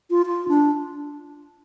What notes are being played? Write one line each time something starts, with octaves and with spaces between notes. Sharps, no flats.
F4
F4
D4